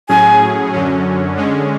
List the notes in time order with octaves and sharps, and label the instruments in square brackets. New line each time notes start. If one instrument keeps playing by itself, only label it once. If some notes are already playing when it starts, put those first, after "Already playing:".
[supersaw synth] A2 F#3 C#4 G#4 [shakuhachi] G#5
[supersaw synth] F#2 D3 F#3 C#4
D3 G#3 C#4